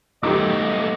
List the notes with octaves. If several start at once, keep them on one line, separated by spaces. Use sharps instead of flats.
D#3 F#3 A3 B3 G4 D#5 D6